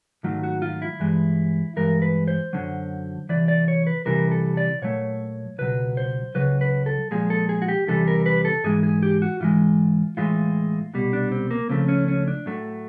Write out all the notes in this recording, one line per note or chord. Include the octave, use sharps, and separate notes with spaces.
G#2 D#3 F#3 A3 F4
F#4
F4
E4
G2 E3 G#3
G2 E3 G#3 A#4
B4
C5
F#2 D3 F#3
C2 C3 E3 D5
D5
C#5
B4
C2 C3 E3 G3 A#4
A4
D5
A#2 F#3 A3 C#5
C#2 B2 F#3 B4
C5
C#2 C#3 F#3 B4
B4
A4
A#2 F3 G#3 G#4
A4
G#4
F#4
G4
E2 C3 E3 G3 A4
A#4
B4
A4
G#2 E3 G#3 G#4
G#4
G4
F#4
G#2 E3 G#3 F4
A2 E3 G#3 F4
C2 B2 G3
D4
C4
A#3
C#2 C#3 F3 A3 C4
C#4
C#4
D4
A2 F#3 A3